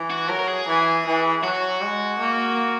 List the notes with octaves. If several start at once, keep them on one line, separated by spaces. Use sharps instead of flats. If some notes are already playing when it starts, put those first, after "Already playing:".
Already playing: E3
F#4
F#3 A#4
A#4
G#4
E3
E3
F#3 F#4
G#3
A#3